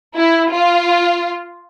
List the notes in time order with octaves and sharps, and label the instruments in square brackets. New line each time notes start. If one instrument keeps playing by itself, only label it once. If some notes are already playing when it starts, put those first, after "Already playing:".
[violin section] E4
F4